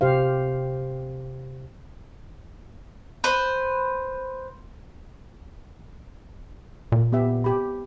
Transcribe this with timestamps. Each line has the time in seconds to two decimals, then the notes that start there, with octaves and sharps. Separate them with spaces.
0.01 C3 G4 C5 F5
3.24 B4 C5
6.92 A#2
7.12 B3 G4 E5
7.44 G4 B5